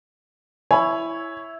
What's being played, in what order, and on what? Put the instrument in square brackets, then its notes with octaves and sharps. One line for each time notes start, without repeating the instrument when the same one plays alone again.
[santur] E4 [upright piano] C#5 B5 [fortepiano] G#5